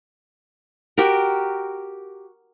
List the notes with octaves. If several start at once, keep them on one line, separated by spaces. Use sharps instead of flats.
F#4 G4 A#4